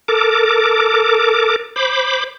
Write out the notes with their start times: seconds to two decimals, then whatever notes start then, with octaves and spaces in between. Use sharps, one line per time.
0.08 A4 A#4 D6
1.76 C5 B5 D6